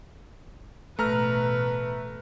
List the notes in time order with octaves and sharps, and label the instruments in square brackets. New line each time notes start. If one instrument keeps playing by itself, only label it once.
[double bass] A1 B2 [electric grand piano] A3 A#5 F6 [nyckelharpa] B4